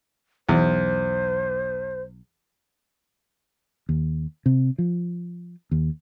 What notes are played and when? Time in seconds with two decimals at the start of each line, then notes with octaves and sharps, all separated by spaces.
0.49 B1 E2 C5
3.89 D#2
4.46 C3
4.78 F3
5.71 D#2